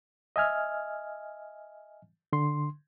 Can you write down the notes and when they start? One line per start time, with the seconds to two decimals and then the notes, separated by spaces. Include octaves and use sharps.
0.36 D#5 E5 G#5 F6
2.33 D3 C6